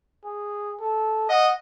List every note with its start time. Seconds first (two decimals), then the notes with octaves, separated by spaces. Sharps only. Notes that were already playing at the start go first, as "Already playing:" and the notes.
0.24 G#4
0.80 A4
1.29 D#5 F#5